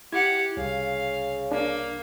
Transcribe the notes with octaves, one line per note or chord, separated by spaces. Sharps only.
E4 G4 F#5 G#6
C2 C#3 F5
A#3 D4